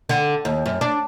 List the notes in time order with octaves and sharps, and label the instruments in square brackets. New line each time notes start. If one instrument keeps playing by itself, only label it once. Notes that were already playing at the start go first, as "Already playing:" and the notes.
[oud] D3
D#2
F#2
D4